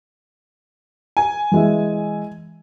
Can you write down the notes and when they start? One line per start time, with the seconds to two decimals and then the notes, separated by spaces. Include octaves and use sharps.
1.17 G#5
1.52 E3 G#3 E5